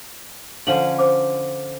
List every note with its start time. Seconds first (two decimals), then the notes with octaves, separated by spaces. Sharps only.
0.67 D3 F3 C#4 F#7
0.99 C5 D6